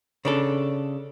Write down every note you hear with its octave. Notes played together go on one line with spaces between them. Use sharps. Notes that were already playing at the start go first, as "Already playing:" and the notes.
C#3 D4 A4